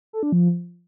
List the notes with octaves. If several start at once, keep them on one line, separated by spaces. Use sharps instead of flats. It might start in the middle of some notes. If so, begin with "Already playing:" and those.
A4
D4
F3